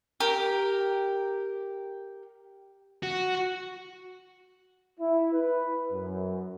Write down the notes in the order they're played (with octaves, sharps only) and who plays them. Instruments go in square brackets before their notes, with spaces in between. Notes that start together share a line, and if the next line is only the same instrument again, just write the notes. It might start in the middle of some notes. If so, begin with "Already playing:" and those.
[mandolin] G4 A#4
[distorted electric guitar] F#4
[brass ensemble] E4
B4
F#2